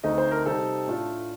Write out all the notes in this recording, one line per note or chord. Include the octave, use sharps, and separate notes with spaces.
D2 D3 A3 C4 D#4 D#5
C5
A#4
C3 G3 C4 D#4 A4
A2 A3 D4 F4